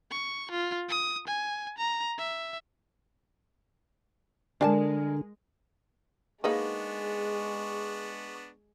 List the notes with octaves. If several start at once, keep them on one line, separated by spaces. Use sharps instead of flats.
C#6
F4
D#6
G#5
A#5
E5
D3 G#3 D4 A#4 F5 G#5 A5
G#3 A#3 B3 D4 D#4 G#4 B4 C#6